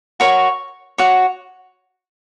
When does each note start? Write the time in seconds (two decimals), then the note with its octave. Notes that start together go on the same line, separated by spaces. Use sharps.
0.20 F#4 A#4 C#5 C#6
0.98 F#4 C#5